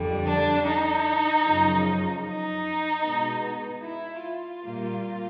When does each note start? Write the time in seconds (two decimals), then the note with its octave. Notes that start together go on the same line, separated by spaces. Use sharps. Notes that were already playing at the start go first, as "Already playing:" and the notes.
Already playing: F2 D3 G3
0.25 D4
0.64 D#4
1.43 F#2 C#3 F3
2.22 D#4
3.02 B2 G#3 B3
3.81 E4
4.20 F4
4.60 A#2 G3 A#3